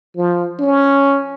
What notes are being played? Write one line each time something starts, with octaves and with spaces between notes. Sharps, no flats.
F3
C#4